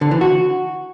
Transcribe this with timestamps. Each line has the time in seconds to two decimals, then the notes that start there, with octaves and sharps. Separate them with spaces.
0.01 D3
0.11 E3
0.21 F#4